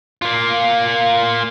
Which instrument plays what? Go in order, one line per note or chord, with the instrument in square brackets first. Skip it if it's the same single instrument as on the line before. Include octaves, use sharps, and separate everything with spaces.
[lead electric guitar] A#3 F4